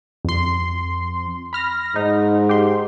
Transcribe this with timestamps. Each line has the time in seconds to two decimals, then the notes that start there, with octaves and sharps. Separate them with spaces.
0.25 F2 C6
1.53 B5 F6 A#6
1.96 G#2 D#4
2.49 G4 C6